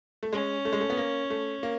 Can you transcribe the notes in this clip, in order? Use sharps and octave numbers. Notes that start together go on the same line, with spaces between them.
A3
G#3 C#4
A3
G#3
A3
B3
A#3
A3
A#3